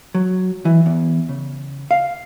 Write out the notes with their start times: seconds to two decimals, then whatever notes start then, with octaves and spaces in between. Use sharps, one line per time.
0.15 F#3
0.65 E3
0.86 E2
1.29 C#3
1.91 F5